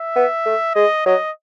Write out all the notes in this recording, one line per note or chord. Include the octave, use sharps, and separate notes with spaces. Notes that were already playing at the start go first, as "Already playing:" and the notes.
Already playing: E5
B3
A3
G#3 D#5
F#3 D#5